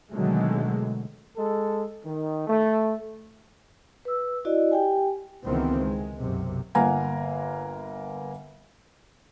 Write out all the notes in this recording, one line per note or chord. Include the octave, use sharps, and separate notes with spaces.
B2 D3 D#3 F#3 G#3 A3
G#3 A4
D#3
A3
B4 E6
E4 F#4 D5 D#5
G4 G5 G#5
C#2 C3 D#3 E3 B3 C4
G#3
B1 F#2 C3
G1 A#3 F5 F#5 G#5 A#5